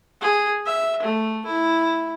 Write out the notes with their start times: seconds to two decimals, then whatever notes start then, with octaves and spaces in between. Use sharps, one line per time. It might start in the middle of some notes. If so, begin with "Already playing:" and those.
0.21 G#4
0.66 E5
1.02 A3
1.46 E4